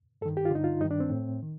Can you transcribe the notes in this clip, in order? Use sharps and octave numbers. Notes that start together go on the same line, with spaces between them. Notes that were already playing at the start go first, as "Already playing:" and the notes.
G2 D#3 A4
G4
F4
G2 D3 D#4
F4
G2 D#3 D#4
D4
C4
A2
D#3